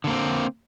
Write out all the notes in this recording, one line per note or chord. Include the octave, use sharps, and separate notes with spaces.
D3 A#3 C4